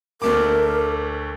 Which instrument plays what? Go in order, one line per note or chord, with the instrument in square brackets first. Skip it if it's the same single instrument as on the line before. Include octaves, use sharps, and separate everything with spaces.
[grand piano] D2 A3 D6 [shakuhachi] A#4